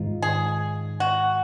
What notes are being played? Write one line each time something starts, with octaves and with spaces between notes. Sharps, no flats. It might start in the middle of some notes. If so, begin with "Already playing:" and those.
Already playing: G#2 D#3 F4
G#4
F#4